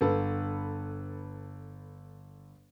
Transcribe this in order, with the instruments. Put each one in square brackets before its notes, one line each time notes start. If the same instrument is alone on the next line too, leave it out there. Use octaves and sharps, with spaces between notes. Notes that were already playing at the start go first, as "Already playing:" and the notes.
[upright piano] G1 A4 B4